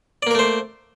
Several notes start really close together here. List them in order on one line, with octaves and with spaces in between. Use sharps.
D5 A#3 A#4 A3 C5